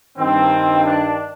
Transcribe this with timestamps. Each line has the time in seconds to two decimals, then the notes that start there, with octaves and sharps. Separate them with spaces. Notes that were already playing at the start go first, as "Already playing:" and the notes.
0.17 G2 D#3 C4
0.84 D4